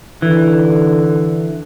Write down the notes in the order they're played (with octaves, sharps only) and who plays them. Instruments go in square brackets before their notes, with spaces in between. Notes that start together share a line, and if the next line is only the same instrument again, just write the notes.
[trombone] D3 [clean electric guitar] E3